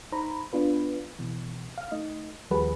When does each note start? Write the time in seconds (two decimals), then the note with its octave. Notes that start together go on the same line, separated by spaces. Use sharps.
0.12 D#4 C5 A#5 B5
0.53 B3 D4 F4 B4
1.19 B2 E3
1.78 F5 F6
1.92 A3 D#4 D#5
2.51 D#2 F3 G3 F#4 G#4 B4